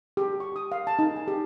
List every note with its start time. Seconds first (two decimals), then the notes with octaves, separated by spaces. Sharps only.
0.17 G4
0.40 C#6
0.56 D#6
0.72 F5
0.87 A5
0.99 D#4
1.16 G#5
1.28 G4